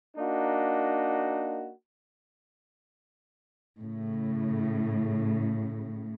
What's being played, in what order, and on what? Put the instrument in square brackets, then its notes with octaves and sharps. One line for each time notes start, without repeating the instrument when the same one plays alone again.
[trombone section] A#3 D4 D#4 F#4
[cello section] A2 C#3